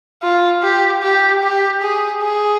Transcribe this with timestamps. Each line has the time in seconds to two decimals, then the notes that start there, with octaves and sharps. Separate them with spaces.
0.23 F4
0.62 G4
1.02 G4
1.42 G4
1.82 G#4
2.22 G#4